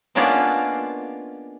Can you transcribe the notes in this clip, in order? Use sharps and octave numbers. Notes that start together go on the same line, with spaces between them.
G#3 A#3 B3 C#4 D4 F4